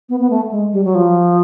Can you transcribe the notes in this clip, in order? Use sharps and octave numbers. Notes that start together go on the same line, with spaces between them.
B3
B3
A3
G#3
G3
F#3
F3